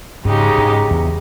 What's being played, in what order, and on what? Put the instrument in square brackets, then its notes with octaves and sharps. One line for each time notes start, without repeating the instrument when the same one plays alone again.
[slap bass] G#2 [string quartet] C#3 G#3 D#4 G4
[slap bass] G#2
E2